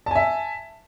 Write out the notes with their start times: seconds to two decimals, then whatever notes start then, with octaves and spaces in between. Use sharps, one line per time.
0.06 A5
0.11 G#5
0.15 E5